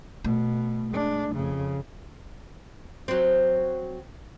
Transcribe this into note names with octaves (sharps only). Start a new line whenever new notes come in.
B2 A3
G#3 D4
F2 C#3
F#3 C4